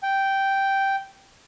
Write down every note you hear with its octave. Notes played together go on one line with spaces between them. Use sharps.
G5